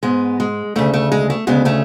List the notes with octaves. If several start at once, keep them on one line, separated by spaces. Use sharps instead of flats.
G#2 G#3 B3
G#3
D2 C#3 A3
A3
G#3
A3
D2 C#3 G#3 B3
A3 C#4